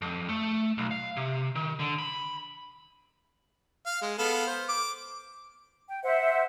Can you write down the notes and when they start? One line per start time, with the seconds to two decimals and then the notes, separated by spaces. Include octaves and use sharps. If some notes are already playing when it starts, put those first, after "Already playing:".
0.02 F2
0.29 A3
0.78 B1
0.91 F5
1.17 C3
1.55 D#3
1.79 D3
1.99 B5
3.86 F5
4.02 G#3
4.18 B3 A4 F5
4.47 C5
4.69 D6
5.88 G5
6.03 C5 E5 F#5